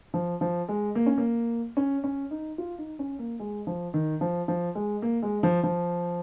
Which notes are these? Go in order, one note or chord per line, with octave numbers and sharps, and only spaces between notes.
F3
F3
G#3
A#3
C#4
A#3
C#4
C#4
D#4
F4
D#4
C#4
A#3
G#3
F3
D#3
F3
F3
G#3
A#3
G#3
F3
F3